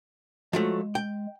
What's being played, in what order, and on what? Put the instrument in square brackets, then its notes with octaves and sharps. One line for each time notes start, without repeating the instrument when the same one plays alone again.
[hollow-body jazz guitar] F3 F#3 A3 [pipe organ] G#3
[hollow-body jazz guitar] G5